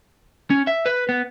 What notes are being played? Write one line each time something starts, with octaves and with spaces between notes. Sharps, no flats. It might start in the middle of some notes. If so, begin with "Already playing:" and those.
C#4
E5
B4
B3